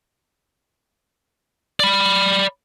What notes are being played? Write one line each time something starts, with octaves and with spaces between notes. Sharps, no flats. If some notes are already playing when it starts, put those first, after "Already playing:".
D5 B5